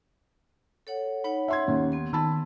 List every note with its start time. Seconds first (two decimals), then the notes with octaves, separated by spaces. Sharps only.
0.87 A4 C#5 F#5
1.24 D#4 C#5 F#5 B5
1.48 E5 C6 G#6
1.68 D#2 C#4
1.92 B3 C6
2.13 D#3 A5 B5 E6